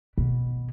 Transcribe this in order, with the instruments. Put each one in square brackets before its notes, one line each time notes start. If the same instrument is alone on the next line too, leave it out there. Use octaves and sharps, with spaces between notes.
[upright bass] B2